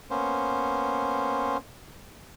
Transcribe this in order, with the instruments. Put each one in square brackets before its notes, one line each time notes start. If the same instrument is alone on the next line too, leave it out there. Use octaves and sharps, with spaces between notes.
[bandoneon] A#3 B3 C#4 C5